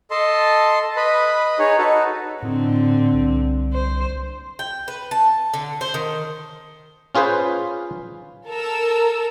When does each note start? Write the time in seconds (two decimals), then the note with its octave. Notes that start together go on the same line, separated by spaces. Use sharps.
0.11 A4 D#5 A5 C6
0.97 B4 D#5 B5
1.59 D#4 G#4 C#5
1.78 D#4 F#4 A4 B4
2.43 A2 D3 C4
3.14 C2
3.73 C5
4.59 G5
4.88 B4
5.11 A5
5.54 D3
5.81 C5
5.94 D#3
7.15 C#4 F4 G#4 B4 C5
8.47 A4 A#4 E6